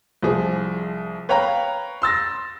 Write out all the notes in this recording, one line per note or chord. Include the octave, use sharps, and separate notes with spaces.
C2 F3 G#4
B4 C#5 F5 G5 A#5 B5
C6 E6 A6 A#6